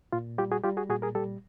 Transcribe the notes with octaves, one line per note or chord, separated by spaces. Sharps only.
A#2 F4
G3 F4 G4
F#4 G#4
G3 F4 G4
F#4 G#4
A#2 F#4 G#4
G#4 A#4
G3 G4 A4